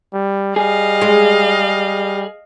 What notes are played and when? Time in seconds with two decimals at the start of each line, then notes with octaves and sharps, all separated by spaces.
0.13 G3
0.56 G3 G#4 D#5 F5
1.02 G#3